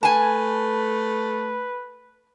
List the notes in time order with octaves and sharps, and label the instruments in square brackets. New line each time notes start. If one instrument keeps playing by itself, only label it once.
[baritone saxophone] A3 [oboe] B4 [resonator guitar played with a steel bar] G#5 A5